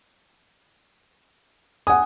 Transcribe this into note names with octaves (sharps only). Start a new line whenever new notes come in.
F#5 G#5 D#6